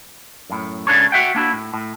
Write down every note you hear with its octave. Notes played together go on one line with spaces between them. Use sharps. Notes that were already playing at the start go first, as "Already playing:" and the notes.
F#2 A2
C#2 C#3 D4 A4 C#5
F#4 E5 F#5 G5
A#3 D4 E4 F#4
A2
A2